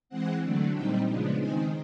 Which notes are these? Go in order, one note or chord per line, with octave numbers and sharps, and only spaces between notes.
E3 G#3 C4 F#5
D3 F#3 A3 D4
A#2 G3 C4 D#4 G5
C#3 F3 G#3 B3 D4
D#3 G#3 C4 D#4 G#5